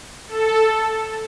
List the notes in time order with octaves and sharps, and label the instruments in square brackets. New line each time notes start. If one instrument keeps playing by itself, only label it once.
[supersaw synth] A4